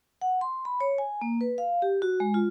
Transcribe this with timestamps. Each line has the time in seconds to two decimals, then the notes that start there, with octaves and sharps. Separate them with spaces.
0.21 F#5
0.41 C6
0.65 B5
0.80 C#5
0.98 G#5
1.21 A#3
1.41 B4
1.58 F5
1.82 G4
2.02 F#4
2.20 G#3
2.34 F4